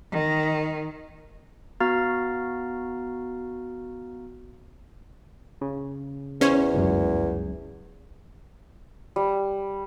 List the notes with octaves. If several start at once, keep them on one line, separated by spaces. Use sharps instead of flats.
D#3
B3 F#4 F5 A#5 F6 A6
C#3
E2 C#4 C5 C#5
G1 C#2 F#2
G3